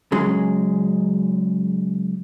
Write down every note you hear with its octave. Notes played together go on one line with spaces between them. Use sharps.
C#3 F#3 G#3